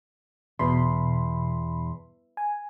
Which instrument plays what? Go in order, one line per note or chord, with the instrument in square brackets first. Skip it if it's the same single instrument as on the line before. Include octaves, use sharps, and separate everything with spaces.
[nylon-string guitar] E2 [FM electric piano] B2 B5 C6
[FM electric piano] G#5